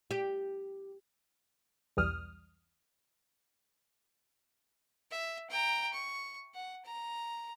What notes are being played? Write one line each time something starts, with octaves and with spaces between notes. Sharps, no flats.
G4
B1 E2 E3 G3 D#6 F6
E5
G5 A#5
C#6
F#5
A#5